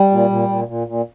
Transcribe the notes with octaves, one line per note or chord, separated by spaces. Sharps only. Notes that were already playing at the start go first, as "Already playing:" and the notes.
Already playing: G3
A#2
A#2
A#2
A#2
A#2